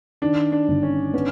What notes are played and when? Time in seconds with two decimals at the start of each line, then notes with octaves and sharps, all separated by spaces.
0.22 D#3 D4
0.52 D4
0.68 G1
0.83 C#4
1.13 B3 C#4